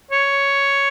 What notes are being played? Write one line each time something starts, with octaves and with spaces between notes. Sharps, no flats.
C#5